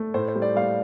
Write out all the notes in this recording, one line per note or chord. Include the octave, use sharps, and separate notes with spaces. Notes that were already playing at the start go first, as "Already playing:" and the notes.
Already playing: A3
A2 C5
C5
G3
D5
G3 F5